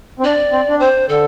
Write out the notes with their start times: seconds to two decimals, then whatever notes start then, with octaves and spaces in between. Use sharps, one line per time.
0.19 C4
0.24 D4 D5
0.52 C4
0.69 D4
0.80 C4 C5
1.09 D3 A4